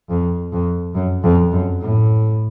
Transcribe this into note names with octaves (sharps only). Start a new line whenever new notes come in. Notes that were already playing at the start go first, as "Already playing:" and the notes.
F2
F2
F#2
F2
F#2
A2